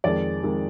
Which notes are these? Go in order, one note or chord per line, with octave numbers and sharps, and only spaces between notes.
F2 D#3 G#3 D5
F2 D#3 G#3